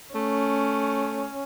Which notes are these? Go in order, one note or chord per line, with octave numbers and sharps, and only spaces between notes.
A3 C#4